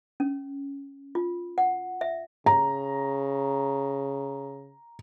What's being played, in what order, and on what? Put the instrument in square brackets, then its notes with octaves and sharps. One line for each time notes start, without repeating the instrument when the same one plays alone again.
[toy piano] C#4
F4
F#5
E5
[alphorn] C#3 [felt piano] A#5